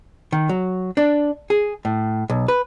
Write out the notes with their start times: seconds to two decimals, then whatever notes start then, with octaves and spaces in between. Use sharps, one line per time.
0.32 D#3
0.49 F#3
0.97 D4
1.50 G#4
1.85 A2
2.30 B1
2.48 B4